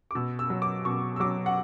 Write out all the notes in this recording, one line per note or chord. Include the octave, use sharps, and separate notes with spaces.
D6
B2 E6
E6
F#3
D6
B2 C#6
E6
F#3 D6
F#5